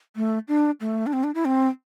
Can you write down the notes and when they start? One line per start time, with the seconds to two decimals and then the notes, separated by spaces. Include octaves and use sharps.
0.16 A3
0.48 D4
0.81 A3
1.06 D4
1.13 C4
1.24 D4
1.35 E4
1.45 C4